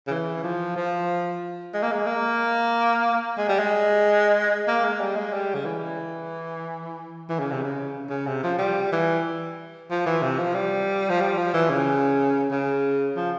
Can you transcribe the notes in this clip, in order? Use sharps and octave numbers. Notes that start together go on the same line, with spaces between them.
C#3
E3
F3
F3
G#3
A#3
G#3
A#3
G#3
G3
G#3
A#3
G#3
G3
G#3
G3
C#3
E3
E3
C#3
C3
C#3
C#3
C3
F3
G3
E3
F3
E3
C3
F3
G3
F3
G3
F3
E3
C#3
C#3
F3